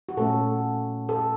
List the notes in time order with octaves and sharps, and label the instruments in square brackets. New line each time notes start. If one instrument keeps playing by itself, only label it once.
[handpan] F#4
A#2 A3 C#4 A4
A4